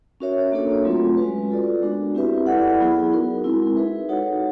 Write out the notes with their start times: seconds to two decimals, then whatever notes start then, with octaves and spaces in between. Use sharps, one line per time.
0.20 C#4 F#4 A#4 C#5 E5
0.52 A#3 D4 F#4 A4 C#5
0.85 F#3 A3 C4 F4
1.17 G#3 C#4 F#4 B4
1.50 F4 A4 D5
1.82 G#3 B3 D4 F#4 A#4
2.15 C4 E4 G4 B4 E5
2.46 E4 A4 D5 F#5
2.80 F#3 B3 E4 G#4
3.12 D#4 F#4 A#4
3.44 G#3 C4 E4
3.76 D#4 G#4 B4 E5
4.09 D#4 F#4 A4 C#5 F#5